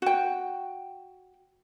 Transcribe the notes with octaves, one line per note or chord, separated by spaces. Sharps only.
F#4 G5